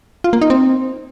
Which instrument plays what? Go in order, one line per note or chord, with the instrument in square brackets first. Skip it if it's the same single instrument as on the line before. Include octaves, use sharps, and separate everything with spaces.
[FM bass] F4
A#3
D#4
C4